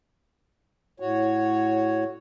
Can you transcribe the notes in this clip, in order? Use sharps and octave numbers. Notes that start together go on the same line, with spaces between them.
A2 F#4 C#5